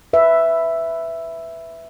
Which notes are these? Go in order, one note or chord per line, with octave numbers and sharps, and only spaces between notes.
B4 E5